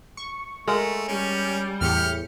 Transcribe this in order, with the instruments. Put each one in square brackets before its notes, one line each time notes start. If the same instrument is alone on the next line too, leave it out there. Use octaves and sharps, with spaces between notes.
[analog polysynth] C#6
[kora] G#3 A#4 F#5 [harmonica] A3
[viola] G3 [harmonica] C#4
[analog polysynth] E2 A2 C#7 [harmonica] G4 F6